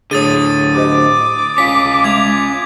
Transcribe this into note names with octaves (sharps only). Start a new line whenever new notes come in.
A2 D3 G#4 C#5 D#6 A6 D#7
G4 C5 D#5 D6
C#4 F4 B6
G#3 G#6 F7